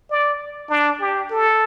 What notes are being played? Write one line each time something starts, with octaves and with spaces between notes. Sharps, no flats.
D5
D4
G4
A4